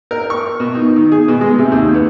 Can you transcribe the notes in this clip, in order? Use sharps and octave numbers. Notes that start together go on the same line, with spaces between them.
A#4
C#6
B2
D#4
D#3
G#4
B2
G#3
C3
D#2
B3